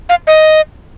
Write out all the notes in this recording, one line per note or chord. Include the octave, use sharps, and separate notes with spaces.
F5
D#5